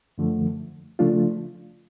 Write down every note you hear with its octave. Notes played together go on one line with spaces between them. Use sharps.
F#2 D3 F3 A3
C#3 F3 A3 D4 F4